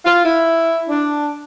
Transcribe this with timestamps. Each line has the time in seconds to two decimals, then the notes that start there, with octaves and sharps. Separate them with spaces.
0.05 F4
0.25 E4
0.90 D4